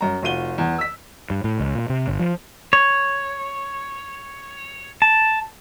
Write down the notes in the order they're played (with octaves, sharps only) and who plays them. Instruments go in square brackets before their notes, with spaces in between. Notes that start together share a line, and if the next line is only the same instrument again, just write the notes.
[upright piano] F#2 A#5
F1 F4 F#4 D#7 G7
E2
E6 B6
[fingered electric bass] G2
A2
C#2
A#2
C3
G1
F3
[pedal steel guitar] C#5
A5